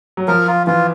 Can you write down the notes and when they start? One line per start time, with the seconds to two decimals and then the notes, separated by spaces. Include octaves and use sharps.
0.17 F#3
0.28 F3 A#4
0.47 F4
0.67 E3 F4